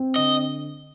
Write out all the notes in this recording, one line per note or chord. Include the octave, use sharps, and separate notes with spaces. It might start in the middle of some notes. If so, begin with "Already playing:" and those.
Already playing: C4
D3 D#5